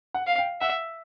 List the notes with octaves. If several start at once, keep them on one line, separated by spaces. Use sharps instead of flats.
F#5
F5
G5
E5 F#5